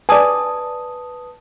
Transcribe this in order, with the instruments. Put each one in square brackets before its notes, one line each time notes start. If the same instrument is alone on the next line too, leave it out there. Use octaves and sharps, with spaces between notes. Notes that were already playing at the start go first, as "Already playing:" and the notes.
[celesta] B4 A5 D#6 [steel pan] D5 G#5